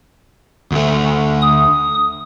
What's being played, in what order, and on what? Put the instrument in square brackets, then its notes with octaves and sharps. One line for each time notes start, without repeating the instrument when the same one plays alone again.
[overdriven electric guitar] D2 A3
[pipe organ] D#6